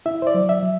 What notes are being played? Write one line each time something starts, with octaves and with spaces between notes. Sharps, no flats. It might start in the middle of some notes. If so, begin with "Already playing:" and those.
E4 E5
C5
D5
F#3
E5
F#3